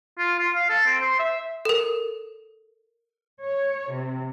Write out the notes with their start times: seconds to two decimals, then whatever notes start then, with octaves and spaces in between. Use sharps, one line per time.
0.19 F4
0.38 F4
0.54 F5
0.69 A4
0.86 C4
1.01 C5
1.19 E5
1.65 A4 A#4
3.42 C#5
3.90 C3